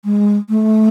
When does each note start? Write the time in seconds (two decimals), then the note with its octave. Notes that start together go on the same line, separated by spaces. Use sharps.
0.05 G#3
0.49 A3